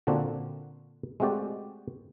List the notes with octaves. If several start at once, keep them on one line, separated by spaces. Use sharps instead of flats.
A#2 D3 A#3 C4 D4 F#4
G#3 A3 C4 F#4 G4 D5